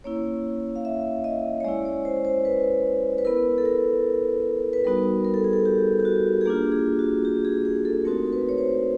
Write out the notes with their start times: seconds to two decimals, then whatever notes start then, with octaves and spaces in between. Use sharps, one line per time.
0.04 A#3 C#4 E4 C#5
0.76 F5
0.85 E5
1.24 D#5
1.60 C#5
1.64 G#3 C#4 E4 D5
1.85 C#5
2.05 C5
2.25 C5
2.45 B4
3.18 B4
3.25 B3 E4 A#4
3.58 A4
3.65 A#4
4.73 B4
4.85 G3 B3 D#4 F#4 A#4
5.25 A#4
5.34 A4
5.44 G#4
5.53 A4
5.65 G4
6.00 G4
6.05 F#4
6.41 G#4
6.46 A#3 D4 F4 G4
6.72 G#4
6.99 F#4
7.25 G4
7.45 G#4
7.65 G#4
7.85 A4
8.05 A3 C4 D#4 F#4 A#4
8.33 B4
8.49 C#5
8.58 C5